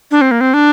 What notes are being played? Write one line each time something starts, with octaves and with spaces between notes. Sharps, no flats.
D4
C4
A#3
C4
D4